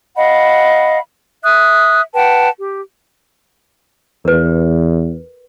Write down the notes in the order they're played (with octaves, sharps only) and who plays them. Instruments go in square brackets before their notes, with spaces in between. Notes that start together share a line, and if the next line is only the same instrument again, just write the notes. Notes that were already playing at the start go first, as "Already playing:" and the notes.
[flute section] D#5 F5 F#5 B5
E5 D#6 F#6
B4 F#5 G5 A5
G4
[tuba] E2 [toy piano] A#4 B4